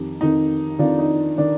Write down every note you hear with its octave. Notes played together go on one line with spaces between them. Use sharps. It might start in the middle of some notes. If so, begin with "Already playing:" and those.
Already playing: F2 D#3 D#4 G4
F2 D#3 D#4
F2 D#3 D4 F4
D#4
D#3 D4